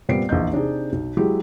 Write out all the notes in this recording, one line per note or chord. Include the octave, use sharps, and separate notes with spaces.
A#2 G3 B3 C4 C7 D7
A#1 E2 D#5 G6
C3 D4 D#4 G#4
B1
F#3 G#3 E4 G4 G#4